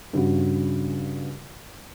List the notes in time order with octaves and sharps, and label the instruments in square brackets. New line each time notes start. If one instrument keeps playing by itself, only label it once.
[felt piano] G2 C#3 F#4